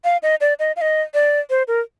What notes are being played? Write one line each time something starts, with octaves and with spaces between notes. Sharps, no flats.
F5
D#5
D5
D#5
F5
D#5
D5
C5
A#4